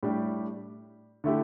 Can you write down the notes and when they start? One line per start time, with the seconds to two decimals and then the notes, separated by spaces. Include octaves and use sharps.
0.03 A2 G3 D4 G4
1.24 D3 A3 E4 G4